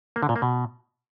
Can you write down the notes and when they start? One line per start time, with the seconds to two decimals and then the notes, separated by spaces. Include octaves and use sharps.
0.16 A#3
0.23 D3
0.29 A#2
0.36 A#3
0.42 B2